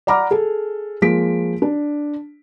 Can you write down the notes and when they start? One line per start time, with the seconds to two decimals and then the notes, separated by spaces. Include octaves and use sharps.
0.07 D5 F#5 A#5 B5 D6 F6
0.31 G#4 A4
1.02 F3 G#3 A#3 B6 D7
1.62 D4